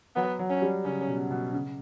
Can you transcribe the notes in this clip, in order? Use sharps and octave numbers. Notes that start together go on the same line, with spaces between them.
F#3 B3
F#3
C#4
G3
C#3 C#4
B2
B2
C#3